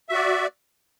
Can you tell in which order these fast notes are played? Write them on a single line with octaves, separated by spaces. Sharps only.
E5 F#4 D5